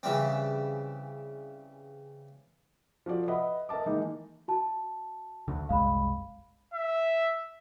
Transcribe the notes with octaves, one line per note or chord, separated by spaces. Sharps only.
C#3 E3 G3 C4
F3 F#4 A4 D5
B4 D#5 E5 F#5 B5
A#4 D#5 E5 A5 D6
D#3 E3 G#3 A#3 D#4
F#4 A5
D2 D3
F#1 C2 G#3 F5 B5
E5